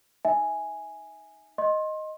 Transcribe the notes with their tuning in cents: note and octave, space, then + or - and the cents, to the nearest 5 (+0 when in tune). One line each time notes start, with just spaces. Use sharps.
D#4 +0 E5 -15 G#5 +0
D#5 +0 C6 +30